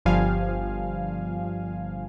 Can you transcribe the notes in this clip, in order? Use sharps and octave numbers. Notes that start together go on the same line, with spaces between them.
G1 F3 G3 F5 G#5